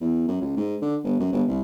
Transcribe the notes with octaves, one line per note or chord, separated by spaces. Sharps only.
E2
F#2
C#2
G#2
D3
G1
F#2
G1
C2